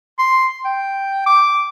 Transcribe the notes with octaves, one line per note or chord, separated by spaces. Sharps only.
C6
G5
D6